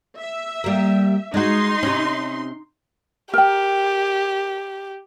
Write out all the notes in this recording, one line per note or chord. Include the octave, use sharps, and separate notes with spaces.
E5
G3 A#3
G#3 D#4 F#4 C6
C3 C#4
G4 A#4 G5